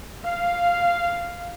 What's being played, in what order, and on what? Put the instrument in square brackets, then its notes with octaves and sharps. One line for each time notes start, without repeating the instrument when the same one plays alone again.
[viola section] F5